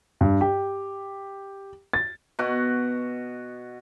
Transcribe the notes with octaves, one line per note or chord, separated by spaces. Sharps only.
G2
G4
A6
B2 F#4